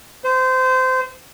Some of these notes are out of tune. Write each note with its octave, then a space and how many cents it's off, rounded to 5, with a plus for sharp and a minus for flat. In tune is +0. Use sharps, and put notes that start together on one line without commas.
C5 -25